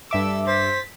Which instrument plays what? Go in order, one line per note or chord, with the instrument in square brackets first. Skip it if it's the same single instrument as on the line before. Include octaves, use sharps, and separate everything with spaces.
[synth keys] G2 E5 D6 [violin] A4 E6
[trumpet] C5 [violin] A6 B6